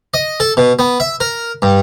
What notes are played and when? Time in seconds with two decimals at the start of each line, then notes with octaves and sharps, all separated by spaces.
0.14 D#5
0.40 A4
0.57 B2
0.79 B3
1.00 E5
1.20 A#4
1.62 G2